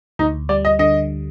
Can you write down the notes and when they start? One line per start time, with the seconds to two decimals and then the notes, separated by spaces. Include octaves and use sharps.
0.19 D2 D#4
0.49 G3 D5
0.65 D#5
0.79 D3 D#5